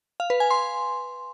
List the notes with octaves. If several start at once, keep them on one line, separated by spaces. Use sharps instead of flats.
F5
B4
G#5
C6